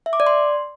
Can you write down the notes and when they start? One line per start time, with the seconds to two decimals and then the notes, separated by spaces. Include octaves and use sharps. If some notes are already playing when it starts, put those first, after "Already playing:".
0.06 E5
0.13 D6
0.20 D5
0.27 C6